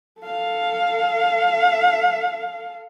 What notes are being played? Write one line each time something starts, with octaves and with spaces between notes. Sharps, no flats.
A4 F5